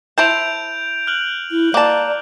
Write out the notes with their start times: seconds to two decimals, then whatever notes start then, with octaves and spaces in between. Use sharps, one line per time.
0.18 E4 C5 A5 G6 D7 F7
1.07 F6 F#6 F#7
1.52 E4
1.74 A#3 D5 A5